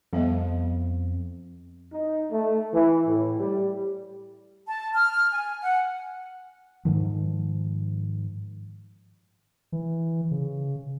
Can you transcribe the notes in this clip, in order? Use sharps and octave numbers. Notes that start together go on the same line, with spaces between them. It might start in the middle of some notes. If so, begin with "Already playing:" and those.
F2 G3 B3 D#5
D#4
A3
E3
A2
G3
A5
F6
G#5
F#5
G#2 D#3 F3
E3
C#3